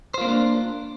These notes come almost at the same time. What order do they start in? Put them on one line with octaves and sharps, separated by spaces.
C5 F4 A#3 C#4 D4